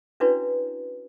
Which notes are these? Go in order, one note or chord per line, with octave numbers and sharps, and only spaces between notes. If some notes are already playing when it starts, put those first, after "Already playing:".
C#4 D4 E4 F#4 B4 C#5